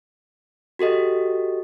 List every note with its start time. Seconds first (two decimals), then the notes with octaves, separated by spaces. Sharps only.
0.79 F#4 G4 A4 D#5